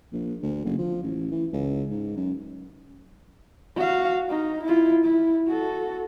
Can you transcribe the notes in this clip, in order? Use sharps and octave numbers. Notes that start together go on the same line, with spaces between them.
A#1
D2
F#1
F3
A1
E3
C#2
G#2
F#2
F#4 F5
D#4
E4 F4
E4
F#4 A4